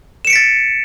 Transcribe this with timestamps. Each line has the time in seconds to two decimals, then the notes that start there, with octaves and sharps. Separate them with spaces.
0.25 E7
0.27 C#7
0.30 D7
0.33 B6
0.36 A6